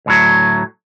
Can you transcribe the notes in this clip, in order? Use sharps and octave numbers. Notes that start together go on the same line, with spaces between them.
D2 A2 F#3